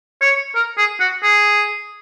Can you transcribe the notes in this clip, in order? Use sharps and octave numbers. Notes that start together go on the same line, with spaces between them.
C#5
A#4
G#4
F#4
G#4